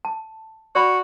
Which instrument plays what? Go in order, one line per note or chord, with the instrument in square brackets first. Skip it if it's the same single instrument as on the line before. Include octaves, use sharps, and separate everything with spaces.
[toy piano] A5
[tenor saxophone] F#4 [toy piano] D5 B5